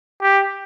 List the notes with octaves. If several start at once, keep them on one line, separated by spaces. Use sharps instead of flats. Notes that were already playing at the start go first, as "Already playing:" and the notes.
G4